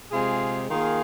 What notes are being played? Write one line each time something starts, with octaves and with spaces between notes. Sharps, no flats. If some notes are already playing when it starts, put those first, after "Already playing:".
C3 G#3 F4 G#4
D#3 A#3 F4 G#4